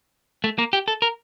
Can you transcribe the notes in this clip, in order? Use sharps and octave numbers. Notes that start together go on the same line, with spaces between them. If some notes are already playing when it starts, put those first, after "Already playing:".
A3
A#3
G4
A4
A#4